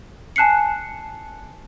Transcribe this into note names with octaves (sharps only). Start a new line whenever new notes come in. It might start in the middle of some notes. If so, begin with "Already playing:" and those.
G#5 A5 F#6 C7 C#7